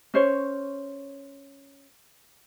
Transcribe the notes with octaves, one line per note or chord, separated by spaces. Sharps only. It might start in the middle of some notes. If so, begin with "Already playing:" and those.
C#4 C5 C#5